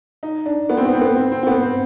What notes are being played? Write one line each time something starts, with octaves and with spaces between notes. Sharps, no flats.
D#4
D4
B3
C4
B3
C4
B3
C4
C4
C4
B3
C4